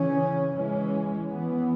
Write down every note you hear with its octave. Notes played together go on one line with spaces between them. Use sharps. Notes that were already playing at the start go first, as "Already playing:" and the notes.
Already playing: C#3 E3 C#4
E3 G#3 C#4
E3 B3